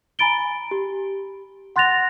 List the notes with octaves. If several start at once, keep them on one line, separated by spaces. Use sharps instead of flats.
G#5 A#5 B5 A6 D7 G7
G4
F#5 C6 F#6 A6 A#6 F7